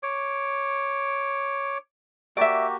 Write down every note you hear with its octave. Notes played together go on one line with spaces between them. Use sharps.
C#5 D6
A#3 F#4 G4 D5 E5